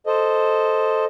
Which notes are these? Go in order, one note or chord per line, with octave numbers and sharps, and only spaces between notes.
A4 C5 D#5